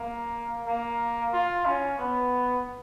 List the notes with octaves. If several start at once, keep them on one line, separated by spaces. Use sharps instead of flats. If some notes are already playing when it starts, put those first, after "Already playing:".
Already playing: A#3
A#3
F4
C#4
B3